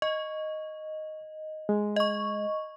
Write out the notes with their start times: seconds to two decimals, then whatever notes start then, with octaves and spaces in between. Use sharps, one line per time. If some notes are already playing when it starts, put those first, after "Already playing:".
0.02 D#5 C#6
1.69 G#3
1.96 D#5 C#6